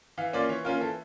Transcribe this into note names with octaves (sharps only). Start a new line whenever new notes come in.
E3 F5
A#3 C#4 F4 D5
E3 C#5
A#3 C#4 F4 A#4
E3 A4